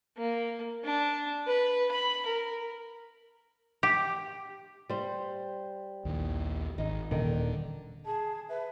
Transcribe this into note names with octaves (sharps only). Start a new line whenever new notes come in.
A#3
D4
B4
B5
A#4
G4
G3 C5
A#1 D#2
G#1 D#4
D#1 D3 D#3
G#4 A5
B4 E5